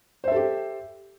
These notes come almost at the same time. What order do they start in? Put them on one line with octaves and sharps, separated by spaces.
C5 E5 A4 G4